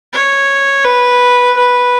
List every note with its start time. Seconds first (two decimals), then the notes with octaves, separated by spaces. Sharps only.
0.13 C#5
0.85 B4
1.57 B4